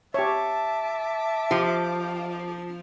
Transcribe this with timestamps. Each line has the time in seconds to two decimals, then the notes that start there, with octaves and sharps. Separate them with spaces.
0.14 G4 C#5 E5 A5 D6
1.51 F3 G4